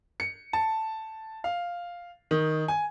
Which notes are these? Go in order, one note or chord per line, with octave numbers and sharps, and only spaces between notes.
C#7
A5
F5
D#3
G#5